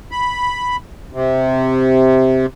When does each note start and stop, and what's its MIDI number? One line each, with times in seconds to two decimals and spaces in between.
0.11 0.77 83
1.13 2.46 48